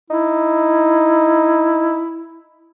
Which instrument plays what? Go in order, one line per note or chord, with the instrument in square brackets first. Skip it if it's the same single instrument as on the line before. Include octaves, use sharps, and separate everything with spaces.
[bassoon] D#4 [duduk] E4